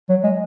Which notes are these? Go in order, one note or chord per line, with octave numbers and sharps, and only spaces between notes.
F#3
G#3